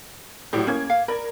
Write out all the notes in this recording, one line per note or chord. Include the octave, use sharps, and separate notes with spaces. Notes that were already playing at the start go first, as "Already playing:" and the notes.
A2 F#3 G4 D5
A#3 C#4 G#6
F5
A#4 D5 B5